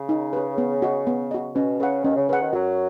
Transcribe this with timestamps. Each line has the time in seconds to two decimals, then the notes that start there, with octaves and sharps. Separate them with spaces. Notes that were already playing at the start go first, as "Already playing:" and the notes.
Already playing: C#3
0.09 D#4
0.33 G#4 B4
0.58 B3
0.82 F#4 D#5
1.07 B3
1.31 F#4 D#5
1.55 B2 C#4
1.80 C#3 B4 F#5
2.04 D#2 D#3 C#4
2.16 C#3
2.29 C#3 B4 F#5
2.40 D#2 D#3
2.53 F#2 F#3 F#4